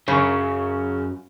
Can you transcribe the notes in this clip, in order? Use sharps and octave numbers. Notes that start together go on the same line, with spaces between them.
F#2 C#3 C#5 C#6